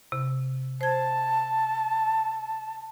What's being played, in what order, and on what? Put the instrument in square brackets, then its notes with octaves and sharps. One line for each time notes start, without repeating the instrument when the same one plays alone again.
[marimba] C3
[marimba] C5 G#6 [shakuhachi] A5